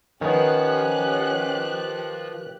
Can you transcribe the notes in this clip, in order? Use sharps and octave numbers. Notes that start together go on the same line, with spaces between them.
D#3 F3 B3 C#4 G4 F#6